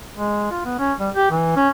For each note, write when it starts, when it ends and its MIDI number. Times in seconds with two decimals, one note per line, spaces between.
0.16 0.46 56
0.51 0.64 65
0.65 0.79 59
0.79 0.93 61
1.00 1.09 55
1.14 1.29 67
1.31 1.54 52
1.56 1.69 61